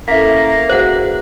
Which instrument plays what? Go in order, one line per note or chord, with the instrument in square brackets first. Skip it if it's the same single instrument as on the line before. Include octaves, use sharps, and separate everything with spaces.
[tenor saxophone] A#3 [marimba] C#4 E4 A4 [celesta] E5 B6 [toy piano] F5
[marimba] F#4 G#4 B4 [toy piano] C5 F#5